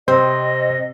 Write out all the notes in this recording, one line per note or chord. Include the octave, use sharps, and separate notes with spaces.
C3 C4 C5 D#5